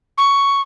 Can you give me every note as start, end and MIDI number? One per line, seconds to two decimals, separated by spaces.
0.17 0.61 85